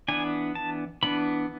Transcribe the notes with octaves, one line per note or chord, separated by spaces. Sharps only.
E3 B3 D4 G#5
A5
E3 B3 D4 B5